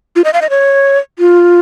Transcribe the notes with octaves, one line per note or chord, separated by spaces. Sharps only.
F4
D#5
F5
D#5
C#5
F4